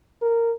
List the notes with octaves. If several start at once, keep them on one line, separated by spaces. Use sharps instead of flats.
A#4